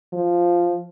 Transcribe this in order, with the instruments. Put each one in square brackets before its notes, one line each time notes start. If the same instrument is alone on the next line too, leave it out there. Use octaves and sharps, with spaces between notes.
[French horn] F3